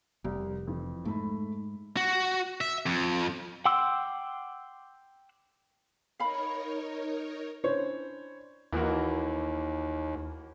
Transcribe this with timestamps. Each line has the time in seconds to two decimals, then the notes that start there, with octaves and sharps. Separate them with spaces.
0.24 F1 C2
0.67 F2 E3
1.05 G#2 A3 B5
1.97 F#4
2.61 E5
2.86 F2
3.65 F#5 G5 C6 D6 E6
6.20 D#4 A#4 C#5 F5 B5
7.64 C#4 D4 E4 C5 C#5
8.73 D#2 E3 A#3 F#4